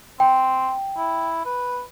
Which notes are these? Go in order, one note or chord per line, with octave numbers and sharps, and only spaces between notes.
C4 G5
E4
B4